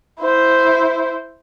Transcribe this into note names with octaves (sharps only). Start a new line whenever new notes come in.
E4 C5